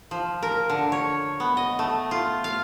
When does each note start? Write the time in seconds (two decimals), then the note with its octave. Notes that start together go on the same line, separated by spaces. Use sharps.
0.11 F3
0.43 A#4
0.69 D3
0.92 C#5
1.40 B3
1.57 D#5
1.79 A3
2.11 F4
2.44 F5